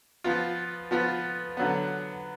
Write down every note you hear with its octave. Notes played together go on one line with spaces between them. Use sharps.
F3 B3 F4
F3 B3 F4
D3 F#3 B3